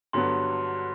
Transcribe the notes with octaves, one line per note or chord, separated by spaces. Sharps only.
G2 D3 F#3 B3 C6